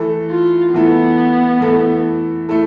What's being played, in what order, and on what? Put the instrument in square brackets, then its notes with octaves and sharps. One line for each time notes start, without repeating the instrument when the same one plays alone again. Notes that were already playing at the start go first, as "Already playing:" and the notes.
Already playing: [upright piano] E3 A3 E4 A4
[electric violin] F4
[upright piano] E3 A3 E4 A4 [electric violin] B3
[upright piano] E3 A3 E4 A4
A3 E4 A4